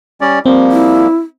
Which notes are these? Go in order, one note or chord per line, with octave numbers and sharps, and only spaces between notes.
G3 C#4 D5
F3 G3 A#3 C4
E4